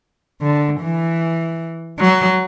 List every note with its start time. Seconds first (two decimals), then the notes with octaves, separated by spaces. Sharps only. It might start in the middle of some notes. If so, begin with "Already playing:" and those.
0.42 D3
0.81 E3
1.99 F#3